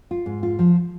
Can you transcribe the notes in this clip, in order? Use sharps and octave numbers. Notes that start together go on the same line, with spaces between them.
F4
G#2
F4
F3